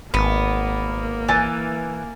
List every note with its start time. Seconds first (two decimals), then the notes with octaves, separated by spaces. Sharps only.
0.14 G#1 A#3 B3
1.29 E3 G#5 A6